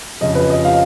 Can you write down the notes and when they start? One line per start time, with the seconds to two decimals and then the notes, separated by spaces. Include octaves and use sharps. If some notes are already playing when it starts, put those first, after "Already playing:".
0.21 F2 C#3 F3 D#5
0.35 B4
0.50 D#5
0.65 F5